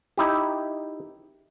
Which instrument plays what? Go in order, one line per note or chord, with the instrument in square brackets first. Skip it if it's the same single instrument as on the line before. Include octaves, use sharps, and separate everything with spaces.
[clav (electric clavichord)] D#4 E4 G4